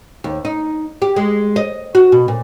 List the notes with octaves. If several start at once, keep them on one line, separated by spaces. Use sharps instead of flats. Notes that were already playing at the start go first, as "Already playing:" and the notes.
D#2
D#4
G4
G#3
D#5
F#4
B2
A#2